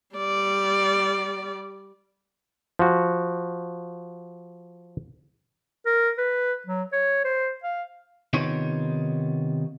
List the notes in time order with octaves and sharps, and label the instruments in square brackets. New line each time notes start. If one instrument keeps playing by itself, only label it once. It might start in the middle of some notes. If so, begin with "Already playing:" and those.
[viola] G3 D5
[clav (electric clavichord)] F3 F#4
[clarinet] A#4
B4
F#3
C#5
C5
F5
[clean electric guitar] C3 D#3 B3 D#4 F4 C#5